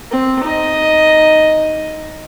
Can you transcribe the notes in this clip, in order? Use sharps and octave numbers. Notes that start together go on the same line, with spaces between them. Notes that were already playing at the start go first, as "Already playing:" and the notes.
C4
D#4 D#5